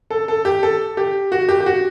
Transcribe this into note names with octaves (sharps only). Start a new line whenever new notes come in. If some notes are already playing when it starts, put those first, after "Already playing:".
A4
A4
G4
A4
G4
F#4
G4
G4
F#4